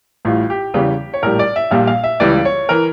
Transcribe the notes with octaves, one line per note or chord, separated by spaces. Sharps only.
A1 A2 G3 F4
G4
E2 C#3 E3 G3
C#5
A#1 A2 G3 A#4
D5
E5
A#1 A#2 G3 A#3 F5
F5
E5
C#2 C#3 E3 G3 D5
C#5
E3 A#4